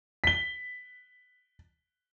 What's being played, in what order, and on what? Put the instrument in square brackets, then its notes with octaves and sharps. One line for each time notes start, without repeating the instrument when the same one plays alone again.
[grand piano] B6 G7